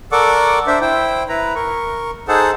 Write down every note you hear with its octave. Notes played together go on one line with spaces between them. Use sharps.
A4 A#4 D5 F#5 C#6 D6
D4 C5 E5
E4 C5 G5
E4 B4 A#5
A#4 C#6
D#4 G#4 A4 C5 F#5 A5